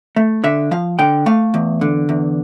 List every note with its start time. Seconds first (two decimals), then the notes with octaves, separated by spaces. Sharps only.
0.16 A3
0.44 D3 E5
0.71 F3 F5
0.99 D3 G5
1.26 A3 F5
1.54 E2
1.81 D3
2.09 E2